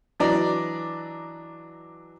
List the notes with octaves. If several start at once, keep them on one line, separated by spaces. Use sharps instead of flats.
E3 F#3 D4 D5 D#5 A#5